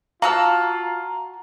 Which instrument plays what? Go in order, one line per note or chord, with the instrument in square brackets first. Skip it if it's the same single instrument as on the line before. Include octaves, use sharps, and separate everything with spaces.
[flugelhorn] F4 [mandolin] F#4 A5 E6 [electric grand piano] F5 [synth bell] A#5